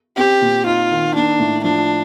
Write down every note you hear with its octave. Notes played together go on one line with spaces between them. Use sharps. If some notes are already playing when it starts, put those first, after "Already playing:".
C4 G4
A#2
D#4 F4
D#3
A#3 D4
A2
F3 D4